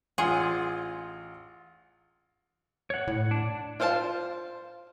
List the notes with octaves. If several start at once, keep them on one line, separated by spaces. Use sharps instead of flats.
A1 F4 G#4 F#5 C6
C#5 F#5
A2
D4
F4 C5 F5 F#5 A5